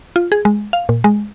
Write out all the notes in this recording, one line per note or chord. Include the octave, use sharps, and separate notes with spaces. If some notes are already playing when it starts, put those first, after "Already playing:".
F4
G#4
G#3
F5
A#2
G#3